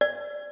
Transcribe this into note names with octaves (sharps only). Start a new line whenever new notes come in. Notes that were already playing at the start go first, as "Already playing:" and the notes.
D5